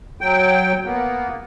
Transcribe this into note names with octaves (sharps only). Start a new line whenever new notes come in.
F#3 G5
A#3 B3